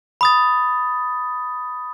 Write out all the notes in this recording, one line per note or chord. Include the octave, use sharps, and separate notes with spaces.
B5 D#6 A6